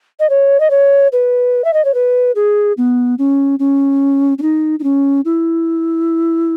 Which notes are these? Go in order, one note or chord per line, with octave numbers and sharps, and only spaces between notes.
D#5
C#5
D#5
C#5
B4
E5
D#5
C#5
B4
G#4
B3
C#4
C#4
C#4
D#4
D#4
C#4
E4